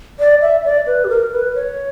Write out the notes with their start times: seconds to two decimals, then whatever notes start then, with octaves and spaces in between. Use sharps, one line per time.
0.20 D5
0.42 E5
0.65 D5
0.87 B4
1.04 G4
1.09 A#4
1.32 B4
1.55 C#5